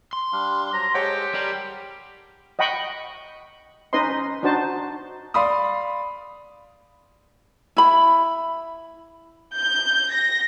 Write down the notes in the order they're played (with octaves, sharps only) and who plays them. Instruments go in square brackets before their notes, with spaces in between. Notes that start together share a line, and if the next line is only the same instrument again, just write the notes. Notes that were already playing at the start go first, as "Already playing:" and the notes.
[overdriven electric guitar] C6
[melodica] G3 D4 F5
[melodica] F#3 C5 [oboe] A#5
[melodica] G#3 A4 C5 [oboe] G4 [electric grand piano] C#5 F#5
[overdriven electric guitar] G3 [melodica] A#4 B5 C6
[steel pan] D#5 F#5 G5 B5 C#6
C#4 D#4 B4 C5 D#5 C6
D4 D#4 F#4 C5 A5
[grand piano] D5 F5 B5 C6 D#6
[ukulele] E4 B5
[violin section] G6
A#6